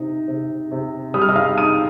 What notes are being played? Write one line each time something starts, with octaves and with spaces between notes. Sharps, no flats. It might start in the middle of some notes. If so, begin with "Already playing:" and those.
Already playing: C3 D#4
C3
C3
G3 D#6
F6
D#5 D#6
F5 F6
D#4 D#6 D#7